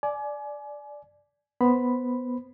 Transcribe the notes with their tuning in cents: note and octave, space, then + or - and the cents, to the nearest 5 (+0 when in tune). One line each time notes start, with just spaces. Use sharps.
D5 +0 G#5 +30
B3 +0 C5 +0 B5 +0